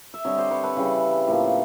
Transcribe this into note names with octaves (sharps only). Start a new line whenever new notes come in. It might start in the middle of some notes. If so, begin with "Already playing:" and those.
E5
D3 G3 C4 C#5 D#5
C5 D5
B4 C#5
A4 B4
C#3 E3 G3 C4
A2 F3 A#3